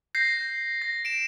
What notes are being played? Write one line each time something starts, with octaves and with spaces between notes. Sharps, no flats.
G6 A#6 C7
A#6
D7 E7